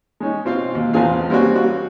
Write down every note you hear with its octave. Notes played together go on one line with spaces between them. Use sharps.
G#3 C#4 D#4
B2 C4 F4 F5
D#2
A1 E2 C4 F4 G#4 F5
G3 A#3 C4 C#4 F#4
F#4